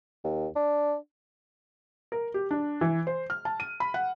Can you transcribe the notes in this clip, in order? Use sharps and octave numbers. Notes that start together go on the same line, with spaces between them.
D#2
D4
A#4
G4
D4
E3
C5
F6
A5
D#7
B5
F#5